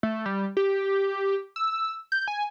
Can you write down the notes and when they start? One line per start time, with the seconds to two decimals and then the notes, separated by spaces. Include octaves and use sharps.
0.03 A3
0.26 G3
0.57 G4
1.56 E6
2.12 G6
2.28 G#5